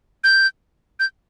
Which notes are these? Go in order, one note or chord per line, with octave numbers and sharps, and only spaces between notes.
G6
G6